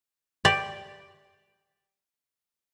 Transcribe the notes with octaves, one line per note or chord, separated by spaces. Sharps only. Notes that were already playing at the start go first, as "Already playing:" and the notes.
G4 D5